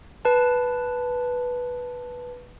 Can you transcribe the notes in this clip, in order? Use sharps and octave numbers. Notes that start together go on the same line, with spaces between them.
B4 A5